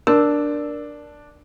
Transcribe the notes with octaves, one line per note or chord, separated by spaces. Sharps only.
D4 A#4